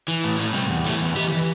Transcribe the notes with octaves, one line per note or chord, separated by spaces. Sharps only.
E3
A2
A2
C3 G3
E2
E3 A3
E2
E3 G4
E3